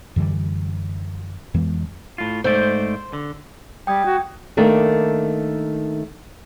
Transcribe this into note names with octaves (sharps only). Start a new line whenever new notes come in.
F#2 D3 E3 G3
F2 E3 G#3 B3
A2 F4
G#2 A3 C5 D5
D3
G3 G5 D#6 G#6
F#4
D#3 A3 A#3 D4